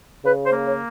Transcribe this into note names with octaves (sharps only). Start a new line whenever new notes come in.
C#3 B4
C5
A#3
C#5